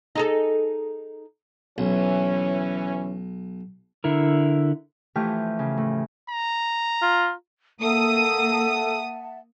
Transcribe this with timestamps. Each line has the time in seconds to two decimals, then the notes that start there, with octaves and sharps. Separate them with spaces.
0.15 D#4 G#4 A4
1.78 B1 E3 C#4
4.04 D3 E4 A#4
5.16 E3 F3 A3 G4 G5 F6
5.59 C#3
5.77 A2
6.30 A#5
7.02 F4
7.82 A#3 A4 E5 F#5 A5 D#6